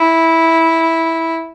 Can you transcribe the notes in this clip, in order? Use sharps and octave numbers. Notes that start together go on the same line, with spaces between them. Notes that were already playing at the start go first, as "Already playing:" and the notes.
Already playing: E4